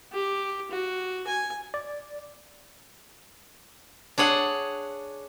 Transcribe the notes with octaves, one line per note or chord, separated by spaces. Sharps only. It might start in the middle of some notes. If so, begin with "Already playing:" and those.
G4
F#4
G#5
D5
D4 G#4 C#5 F#5